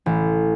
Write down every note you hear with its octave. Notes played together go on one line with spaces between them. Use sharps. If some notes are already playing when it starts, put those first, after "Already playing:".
A1